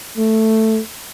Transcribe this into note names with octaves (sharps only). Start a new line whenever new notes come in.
A3